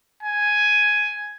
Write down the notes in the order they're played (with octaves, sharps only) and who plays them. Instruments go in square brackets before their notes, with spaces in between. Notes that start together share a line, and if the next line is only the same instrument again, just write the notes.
[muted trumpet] G#5